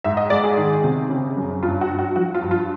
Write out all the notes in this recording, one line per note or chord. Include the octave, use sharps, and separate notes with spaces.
G#2 E5
D#5
G#3 D5
G#4
D#3
C3
C#3
F#2
G2 F4
F#4
G2
F#4
F3 F#4
F4
G2
F4